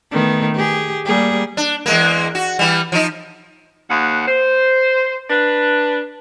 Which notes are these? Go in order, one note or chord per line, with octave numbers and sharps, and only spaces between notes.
D#3 A3 B3
G4 G#4
G3 A#3 G#4
D4
E2 G#3 A#3
F#4
E3 G3
F3 D#4
D#2 F#5
C5
D4 B4